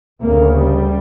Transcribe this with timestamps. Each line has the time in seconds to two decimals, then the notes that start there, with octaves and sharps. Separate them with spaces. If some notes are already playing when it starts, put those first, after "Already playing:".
0.22 D2 C#3 A#3
0.55 G3